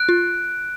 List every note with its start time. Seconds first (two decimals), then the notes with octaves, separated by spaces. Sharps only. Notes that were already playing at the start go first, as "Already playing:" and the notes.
Already playing: F#6 D7
0.09 F4